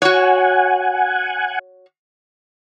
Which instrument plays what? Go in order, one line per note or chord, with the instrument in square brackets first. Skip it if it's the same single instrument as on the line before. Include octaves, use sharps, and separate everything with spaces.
[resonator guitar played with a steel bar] F#4 C#5 [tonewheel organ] F#5 G#5